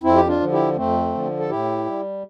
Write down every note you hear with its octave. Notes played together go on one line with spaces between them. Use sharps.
F2 C4 E4
G4
D4 F4
D3 F3
E4 G4
F2 A3 C4
D3 F3
A4
A2 E4 G4
G3